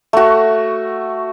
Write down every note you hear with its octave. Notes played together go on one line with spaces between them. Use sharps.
A3 F#4